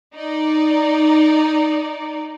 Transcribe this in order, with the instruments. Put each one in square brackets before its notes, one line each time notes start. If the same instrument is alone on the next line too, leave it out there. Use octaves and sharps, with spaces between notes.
[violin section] D#4 D5